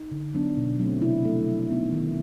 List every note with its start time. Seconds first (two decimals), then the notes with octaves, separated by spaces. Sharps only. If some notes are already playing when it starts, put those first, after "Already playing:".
Already playing: D#4
0.12 D3
0.34 F#3 B3 D4
0.57 B2
0.79 F#3 A3 C4
1.02 C3 E4
1.25 F3 A3
1.48 F#3
1.71 B3 D#4
1.92 D#3